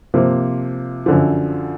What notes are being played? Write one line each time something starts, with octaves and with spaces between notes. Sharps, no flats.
C3 F3 A#3
F#2 D3 F3